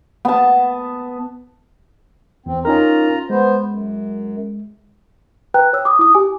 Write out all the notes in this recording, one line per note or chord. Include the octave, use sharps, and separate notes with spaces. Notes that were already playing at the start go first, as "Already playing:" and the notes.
B3 A5
E2 C4
C#4 D#4 F4 A#4 A#5
G#3 B3 C5
F#2
B4 G5 A#5 F#6
C#5 E6
D6 D#6
E4 D#6
G4 G#5 D6